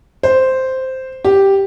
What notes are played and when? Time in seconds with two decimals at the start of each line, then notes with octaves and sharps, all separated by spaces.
0.23 C5
1.25 G4